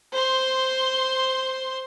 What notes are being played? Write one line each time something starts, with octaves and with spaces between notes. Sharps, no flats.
C5 C6